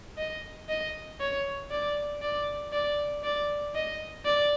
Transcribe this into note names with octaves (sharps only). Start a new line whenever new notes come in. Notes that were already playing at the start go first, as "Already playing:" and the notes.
D#5
D#5
C#5
D5
D5
D5
D5
D#5
D5